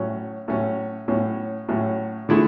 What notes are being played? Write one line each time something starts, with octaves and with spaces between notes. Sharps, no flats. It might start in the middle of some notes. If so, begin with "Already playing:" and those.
Already playing: A2 F#3 C#4
A2 F#3 C#4
A2 F#3 C#4
A2 F#3 C#4
D3 A3 E4 G#4